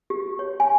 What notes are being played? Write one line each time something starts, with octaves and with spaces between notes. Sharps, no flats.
G4
C#5
G#5